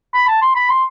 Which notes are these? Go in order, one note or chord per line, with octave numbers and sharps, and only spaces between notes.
B5
A5
C6
B5
C6